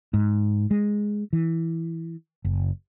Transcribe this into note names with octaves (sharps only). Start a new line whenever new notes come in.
G#2
G#3
E3
F#1